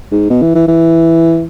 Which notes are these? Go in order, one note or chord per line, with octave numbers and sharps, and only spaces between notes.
G#2
B2
E3
E3
E3